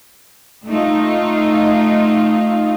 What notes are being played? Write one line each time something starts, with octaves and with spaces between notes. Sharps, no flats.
A3 D#4 F4